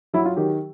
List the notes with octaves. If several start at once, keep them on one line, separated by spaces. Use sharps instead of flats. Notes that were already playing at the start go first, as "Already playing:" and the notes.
F#3 E4
F4
D#3 G4